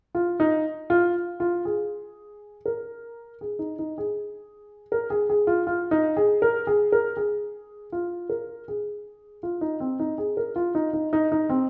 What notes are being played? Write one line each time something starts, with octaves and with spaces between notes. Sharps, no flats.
F4
D#4
F4
F4
G#4
A#4
G#4
D#4
D#4
G#4
A#4
G#4
G#4
F4
F4
D#4
G#4
A#4
G#4
A#4
G#4
F4
A#4
G#4
F4
D#4
C4
D#4
G#4
A#4
F4
D#4
D#4
D#4
D#4
C4